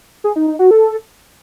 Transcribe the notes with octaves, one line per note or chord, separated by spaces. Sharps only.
G#4
D#4
D#4
F#4
A4